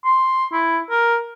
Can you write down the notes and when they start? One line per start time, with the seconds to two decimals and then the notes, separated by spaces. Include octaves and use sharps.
0.05 C6
0.53 E4
0.90 A#4